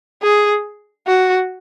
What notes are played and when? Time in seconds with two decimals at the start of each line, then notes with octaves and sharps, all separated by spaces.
0.23 G#4
1.08 F#4